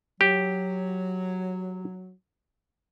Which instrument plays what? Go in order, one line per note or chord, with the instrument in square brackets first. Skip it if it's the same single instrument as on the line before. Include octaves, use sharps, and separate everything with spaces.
[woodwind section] F#3 [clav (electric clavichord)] G4